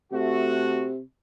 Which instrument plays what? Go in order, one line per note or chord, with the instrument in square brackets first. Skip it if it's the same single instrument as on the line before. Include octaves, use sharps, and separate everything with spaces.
[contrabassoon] C3 [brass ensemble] A3 F#4